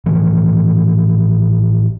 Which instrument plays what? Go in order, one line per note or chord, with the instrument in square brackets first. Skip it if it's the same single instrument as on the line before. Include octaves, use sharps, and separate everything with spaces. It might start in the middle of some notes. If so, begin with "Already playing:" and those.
[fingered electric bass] A2 D3 E3 F3